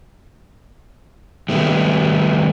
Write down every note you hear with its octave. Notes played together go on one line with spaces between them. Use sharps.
D#3 G3 A3 B3